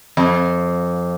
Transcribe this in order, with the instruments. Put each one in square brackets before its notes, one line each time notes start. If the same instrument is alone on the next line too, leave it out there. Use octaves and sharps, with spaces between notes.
[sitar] F2